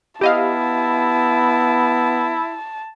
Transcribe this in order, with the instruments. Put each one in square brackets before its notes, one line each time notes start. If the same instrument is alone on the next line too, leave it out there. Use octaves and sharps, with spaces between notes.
[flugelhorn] B3 [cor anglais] E4 [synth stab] G4 D#5 F5 [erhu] A5